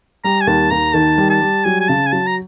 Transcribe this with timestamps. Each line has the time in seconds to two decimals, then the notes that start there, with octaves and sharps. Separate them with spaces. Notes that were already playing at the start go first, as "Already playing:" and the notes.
0.24 G3 A#5
0.41 G#5
0.47 D#2 A5
0.70 D#2 A#5
0.94 D#3 A5
1.18 G3
1.30 A5
1.41 G3
1.64 F#3 G#5
1.80 G#5
1.88 C#3 A5
2.07 G#5
2.12 F#3 A5
2.27 A#5